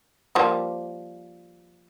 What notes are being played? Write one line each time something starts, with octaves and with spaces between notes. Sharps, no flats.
F3 G3 A#3